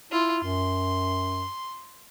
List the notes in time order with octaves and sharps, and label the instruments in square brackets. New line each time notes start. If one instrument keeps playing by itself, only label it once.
[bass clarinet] E4 [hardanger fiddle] F4
[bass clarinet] F#2 [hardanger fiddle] C6